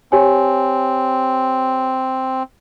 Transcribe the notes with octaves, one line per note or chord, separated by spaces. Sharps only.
C4 G4 C#5 G#5